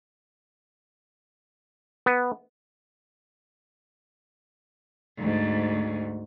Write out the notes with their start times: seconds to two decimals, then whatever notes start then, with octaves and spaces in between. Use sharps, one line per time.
2.06 B3
5.17 D2 G#2